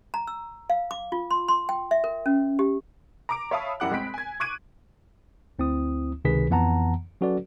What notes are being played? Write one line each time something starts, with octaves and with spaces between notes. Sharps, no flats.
A#5
E6
F5
D6
F4
C6
C6
G5
E5
A#4
C#4
G4
A#5 D6 D7
C#5 E5 F5 A5 B5 D#6
F#2 G3 E4 F#5 D6 F#6
G#3 C4 B5 B6 D7
G#5 G#6
C#6 D6 F#6 G#6 D7 D#7
D2 C4 E4 D#6
C#2 C3 D#3 G#4 B4 B6
F2 E3 B3 F#5 A5 A#5
F#3 C#4 F#4 A4 B4 D5